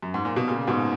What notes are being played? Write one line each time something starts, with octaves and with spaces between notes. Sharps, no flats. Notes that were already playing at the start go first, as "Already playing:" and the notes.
F#2
G#2
A#2
B2
A#2 C#3
G#2 B2